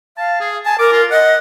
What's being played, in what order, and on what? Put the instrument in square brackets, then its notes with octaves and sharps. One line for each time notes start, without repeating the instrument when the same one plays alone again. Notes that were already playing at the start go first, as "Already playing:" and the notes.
[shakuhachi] F5 [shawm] A5
[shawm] G#4
[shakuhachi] G#5 [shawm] A5
[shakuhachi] A#4 [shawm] D6
[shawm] F4
[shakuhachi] D#5 [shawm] F#5